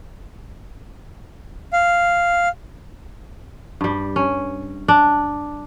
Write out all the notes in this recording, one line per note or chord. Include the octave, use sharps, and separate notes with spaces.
F5
G2 G3
C#4
D4